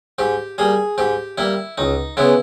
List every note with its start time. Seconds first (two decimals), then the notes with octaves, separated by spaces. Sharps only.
0.19 G#2 G4
0.58 G3 A#3 G#4
0.98 G#2 G4
1.38 G3 A#3 E4
1.78 C#2 D#4
2.17 C#3 G#3 B3 E4